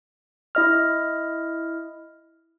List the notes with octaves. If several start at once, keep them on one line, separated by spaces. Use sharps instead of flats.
E4 D#5 F6